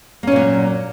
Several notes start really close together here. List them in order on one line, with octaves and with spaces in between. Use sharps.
A#3 C#4 A#2 F#3